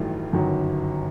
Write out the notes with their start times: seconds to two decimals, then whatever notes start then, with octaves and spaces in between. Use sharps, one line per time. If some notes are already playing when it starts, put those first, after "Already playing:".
Already playing: A1 G2 D#3 F#3 A3
0.33 G1 F#2 D#3 F#3